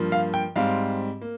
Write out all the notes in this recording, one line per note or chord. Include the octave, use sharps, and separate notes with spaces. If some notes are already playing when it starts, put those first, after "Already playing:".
Already playing: G2 F3 A#3
F5
G5
G#2 G3 C4 F5
A#3